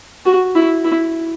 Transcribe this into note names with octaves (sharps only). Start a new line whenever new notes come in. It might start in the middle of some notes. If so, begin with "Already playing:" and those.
F#4
E4
E4